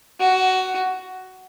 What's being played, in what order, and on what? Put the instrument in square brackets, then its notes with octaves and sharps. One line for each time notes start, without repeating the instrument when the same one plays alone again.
[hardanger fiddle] F#4